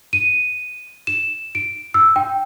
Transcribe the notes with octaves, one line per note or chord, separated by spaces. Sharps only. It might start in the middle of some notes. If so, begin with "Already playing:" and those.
D#7
E7
D7
E6
G5